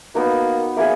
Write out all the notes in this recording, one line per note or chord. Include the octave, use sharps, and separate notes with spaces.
A#3 B3 D#4 F#4
A#3 G#4 C#5 E5